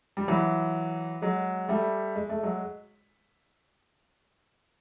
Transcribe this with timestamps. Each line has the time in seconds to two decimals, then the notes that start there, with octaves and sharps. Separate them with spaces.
0.17 G3
0.28 E3 F#3
1.22 F#3 G#3
1.69 G3 A3
2.16 G#3
2.29 A3
2.43 F#3 G#3